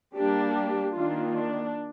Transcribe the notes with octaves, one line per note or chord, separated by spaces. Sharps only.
G3 A#3 D4 G4
G4
D#3 A#3 D4 F4
D4